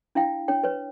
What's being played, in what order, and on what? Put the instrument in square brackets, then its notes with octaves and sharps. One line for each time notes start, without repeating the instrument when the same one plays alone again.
[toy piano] D4 E4 F5 G5
D4 C#5 G5
B4 C#5